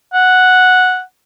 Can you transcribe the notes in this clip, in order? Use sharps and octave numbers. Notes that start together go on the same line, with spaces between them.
F#5